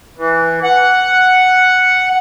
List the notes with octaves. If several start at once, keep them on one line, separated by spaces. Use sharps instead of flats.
E3
F#5